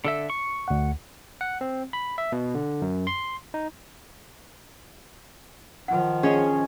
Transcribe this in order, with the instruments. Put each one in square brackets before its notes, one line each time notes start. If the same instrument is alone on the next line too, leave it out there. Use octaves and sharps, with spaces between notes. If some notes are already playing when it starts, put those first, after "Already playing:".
[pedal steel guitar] D3 A4 E5
C#6
[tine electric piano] D2 F#5
F#5
C4
B5
E5
B2
D3
F#2
C6
D#4
[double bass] D#3 F3 [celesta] F#5
[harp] C#4 [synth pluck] G#4 C#5 D#5